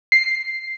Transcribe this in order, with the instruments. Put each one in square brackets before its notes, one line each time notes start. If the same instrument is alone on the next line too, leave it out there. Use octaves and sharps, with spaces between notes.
[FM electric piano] C7